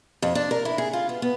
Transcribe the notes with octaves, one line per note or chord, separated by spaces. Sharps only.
F2
D4
A#4
E4
G#4
F4
B3
B3